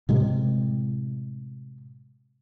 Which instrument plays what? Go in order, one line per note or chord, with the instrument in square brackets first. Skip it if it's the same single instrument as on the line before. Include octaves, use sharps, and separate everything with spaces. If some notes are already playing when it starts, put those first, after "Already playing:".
[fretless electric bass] A2 C3 G#3